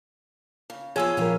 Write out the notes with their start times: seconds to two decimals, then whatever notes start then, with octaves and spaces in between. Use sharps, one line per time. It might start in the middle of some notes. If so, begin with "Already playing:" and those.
0.70 C#3
0.96 F3 B3 G#4 C5 C#5 G#5 E6
1.17 A#2 F3 F4 G4 A#4 F5